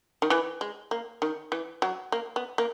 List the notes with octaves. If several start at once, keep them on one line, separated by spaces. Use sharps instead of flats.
D#3
E3
G#3
A#3
D#3
E3
F#3
A#3
B3
A#3